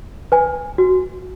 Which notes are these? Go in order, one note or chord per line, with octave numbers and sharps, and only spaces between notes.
B4 G#5
F#4